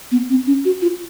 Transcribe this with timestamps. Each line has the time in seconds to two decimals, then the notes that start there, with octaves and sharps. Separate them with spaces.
0.11 B3
0.30 C4
0.47 C#4
0.65 F#4
0.82 F4